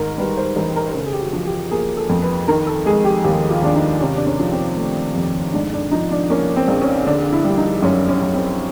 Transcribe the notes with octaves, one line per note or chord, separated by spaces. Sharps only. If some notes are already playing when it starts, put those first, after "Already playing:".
Already playing: G#2 D#3 A#4
G3 B4
C5
A1 A#4
A#4
A#4
C#3 A4
G#4
G4
F#4
F3
G4
A#3 G#4
A4
F2
B4
D#3 A#4
A4
G#3 G#4
G4
D#2 G4
F4
D#2 D4
D#4
C3 C#4
D4
C#4
F3
C4
A3
F2
G#2 D4
D4
F3 D#4
D4
A#3 C#4
C4
A#1
C#4
D3 D4
E4
G3
D#4
F#2 C#4
C#4
F#2
C4